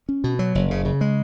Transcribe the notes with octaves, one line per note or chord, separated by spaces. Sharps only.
C#4
B2
F#3
F#1
C#3
C#3
G#3